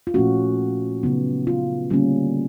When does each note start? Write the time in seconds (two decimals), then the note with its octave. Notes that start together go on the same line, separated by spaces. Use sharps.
0.07 F4
0.14 A#2 F3 A3 C#4 F#4
1.03 C#3 F#3 B3 D#4
1.47 F4
1.90 D3 G3 A#3 C#4